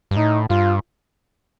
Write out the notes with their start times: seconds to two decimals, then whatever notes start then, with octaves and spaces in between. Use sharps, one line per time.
0.11 G2
0.16 A2 D#4
0.50 G2 F4